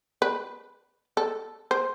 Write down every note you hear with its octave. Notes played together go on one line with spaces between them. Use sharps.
B4
A4
C5